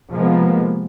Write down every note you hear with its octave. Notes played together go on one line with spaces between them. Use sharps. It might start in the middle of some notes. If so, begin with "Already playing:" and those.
C3 F3 G#3 A#3 B3